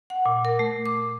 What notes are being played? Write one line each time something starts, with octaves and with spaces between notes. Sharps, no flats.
F#5
A#2
A#4
A3
D6